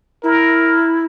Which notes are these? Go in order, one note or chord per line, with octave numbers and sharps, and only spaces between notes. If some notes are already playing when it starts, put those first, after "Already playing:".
E4 A#4